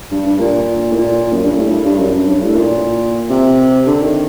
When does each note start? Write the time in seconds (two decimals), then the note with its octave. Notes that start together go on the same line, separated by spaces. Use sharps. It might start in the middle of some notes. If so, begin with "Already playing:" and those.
0.11 G2
0.26 G2
0.39 A#2
0.92 A2
0.97 A#2
1.33 F#2
1.44 G2
1.56 A2
1.71 G2
1.85 G2
1.99 F#2
2.14 F#2
2.28 G2
2.42 A2
2.57 A#2
3.30 C3
3.87 D3
4.02 D#3